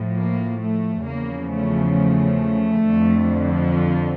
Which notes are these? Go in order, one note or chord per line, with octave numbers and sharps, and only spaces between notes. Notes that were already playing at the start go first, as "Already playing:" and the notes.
Already playing: A2 F3
A#3
A3
E2 C#3 F3 A#3
A3
A3
F2 D3 F3